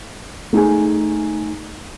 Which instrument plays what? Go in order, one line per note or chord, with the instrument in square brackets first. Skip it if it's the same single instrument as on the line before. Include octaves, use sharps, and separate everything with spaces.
[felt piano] A3 D#4 G#4 G#5